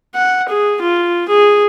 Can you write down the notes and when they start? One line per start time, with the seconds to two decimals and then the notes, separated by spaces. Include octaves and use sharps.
0.15 F#5
0.49 G#4
0.82 F4
1.29 G#4